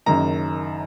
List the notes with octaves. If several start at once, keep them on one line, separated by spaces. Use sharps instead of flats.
F#1 F#2 D#3 A#5